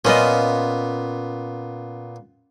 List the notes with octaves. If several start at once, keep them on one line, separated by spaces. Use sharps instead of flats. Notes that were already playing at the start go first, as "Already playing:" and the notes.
A#2 B3 C#4 F4 D#5